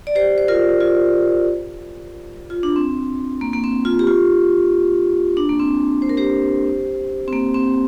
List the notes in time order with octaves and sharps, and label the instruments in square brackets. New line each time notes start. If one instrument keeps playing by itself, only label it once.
[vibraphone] D5
G4 C5
C5
F4 A#4
F4
F4
D4
C4
A#3
A#3
C4
F4
G4
F4
D4
A#3
C4
C5
A#4
G4 C5
C4
A#3
C4